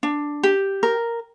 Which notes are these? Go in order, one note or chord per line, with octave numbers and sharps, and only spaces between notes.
D4
G4
A#4